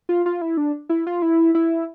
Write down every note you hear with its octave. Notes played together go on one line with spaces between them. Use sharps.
F4
F4
E4
D4
E4
F4
E4
E4